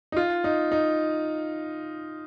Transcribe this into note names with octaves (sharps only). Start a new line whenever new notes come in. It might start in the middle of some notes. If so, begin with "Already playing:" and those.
D#4
F4
D#4
D#4